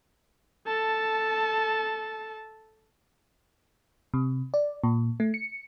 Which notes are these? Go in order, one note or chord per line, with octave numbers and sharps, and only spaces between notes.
A4 A5
C3
D5
A#2
A3
C#7